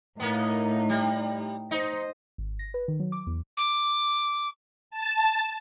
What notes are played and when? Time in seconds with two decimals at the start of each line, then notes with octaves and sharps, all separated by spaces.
0.20 A2 A#3 B3 D#4
0.89 G3
1.71 D#4 C5 D#5
2.38 G#1
2.59 A#6
2.74 B4
2.88 D#3
3.00 F#3
3.12 D6
3.27 E2
3.57 D6
4.91 A5